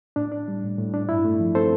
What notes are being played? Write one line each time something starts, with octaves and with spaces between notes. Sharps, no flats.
A2 D4
D4
G3
A2
A2
D4
G2 E4
A3
F3
C4 A4 C5